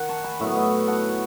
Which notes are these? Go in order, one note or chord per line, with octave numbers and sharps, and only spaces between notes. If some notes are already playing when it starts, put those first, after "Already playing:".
Already playing: D#3 F#5
A5 C#6
G#5 B5
A2 F#3 B3 C#5 E5
B4 D#5
F#5 A5